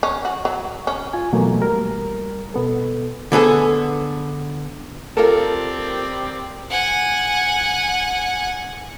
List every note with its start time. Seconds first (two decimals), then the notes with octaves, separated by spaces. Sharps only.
0.03 C#4
0.25 F#4
0.45 F#3
0.87 C#4
1.13 F4 G#5
1.33 B2 E3 F#3 A3 A#3
1.60 G3 A#4
2.54 B2 B3 A4
3.32 D3 B3 G#4 A4
5.17 C4 F4 G4 A4 A#4 D5
6.70 F#5 G#5